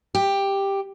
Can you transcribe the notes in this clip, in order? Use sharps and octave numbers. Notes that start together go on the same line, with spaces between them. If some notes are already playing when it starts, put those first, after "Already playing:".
G4